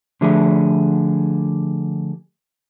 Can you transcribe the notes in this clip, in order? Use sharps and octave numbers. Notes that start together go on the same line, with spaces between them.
D3 F3 A3 G4 G#4